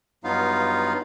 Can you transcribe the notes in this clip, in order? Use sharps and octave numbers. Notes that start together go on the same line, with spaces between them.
G2 F#3 B3 D#4 F4 F5